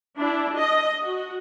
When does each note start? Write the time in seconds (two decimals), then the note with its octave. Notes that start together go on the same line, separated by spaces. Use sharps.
0.18 D4 E4
0.56 D#5
1.03 F#4